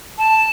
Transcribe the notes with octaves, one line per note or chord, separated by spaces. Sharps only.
A5